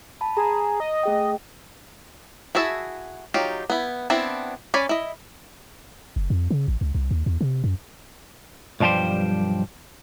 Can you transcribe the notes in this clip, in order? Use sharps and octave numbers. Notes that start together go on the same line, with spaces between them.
A5 B5
G#4 A#5
D#5
A3 G#4 G5
E4 F#4 G#4 E5 A5
F#3 D#4 F4 G4
B3 E4
B3 C4 D4 E4
C#4 D5 G#5 B5
E4 D#5
F#1
F2
C#3
A1
C#2
C2
D#2
E2
C3
F#2
B1 G2 F3 G3 G4 C5